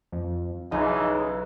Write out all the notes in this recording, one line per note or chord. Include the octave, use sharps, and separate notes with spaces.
F2
B1 C#3 E3 G#3 D#4